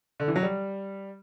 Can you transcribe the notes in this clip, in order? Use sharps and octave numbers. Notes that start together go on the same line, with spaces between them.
D3
E3
F#3
G3